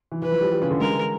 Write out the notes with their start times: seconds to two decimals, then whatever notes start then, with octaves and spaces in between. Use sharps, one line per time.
0.12 E3
0.22 E3 B4
0.32 F3
0.41 G3
0.52 G3
0.62 C#3
0.71 D3
0.81 G#3 A#4